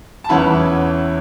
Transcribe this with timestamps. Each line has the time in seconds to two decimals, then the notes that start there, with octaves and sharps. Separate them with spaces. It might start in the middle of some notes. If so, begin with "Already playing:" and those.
0.24 A5
0.29 E2 E3 C#4 E4 F#5 B5